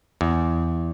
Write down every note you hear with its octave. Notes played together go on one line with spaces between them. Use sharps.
E2